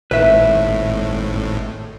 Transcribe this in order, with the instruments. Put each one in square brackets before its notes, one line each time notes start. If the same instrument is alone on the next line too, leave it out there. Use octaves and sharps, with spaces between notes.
[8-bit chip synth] G#1 A2 [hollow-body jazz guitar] B4 E5